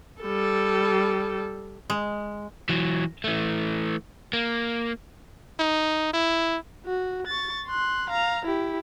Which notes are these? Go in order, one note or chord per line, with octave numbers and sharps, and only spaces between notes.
G3 A4
G#3
E3 F#3
E3 A3
A#3
D#4
E4
F#4
C#6 A6
C6 F#6
F5 A#5
E4 G4